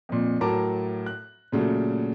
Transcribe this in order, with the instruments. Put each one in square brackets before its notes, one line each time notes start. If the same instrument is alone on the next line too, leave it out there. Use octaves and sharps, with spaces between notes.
[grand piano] F2 A#2
A2 F#3 A#4 A5 A#5 D6
F#6
A#2 C#3 F#3 A3